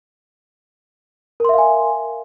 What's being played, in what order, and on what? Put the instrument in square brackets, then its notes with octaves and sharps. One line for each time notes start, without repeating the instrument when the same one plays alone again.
[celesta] A#4
C6
E5
F5
G#5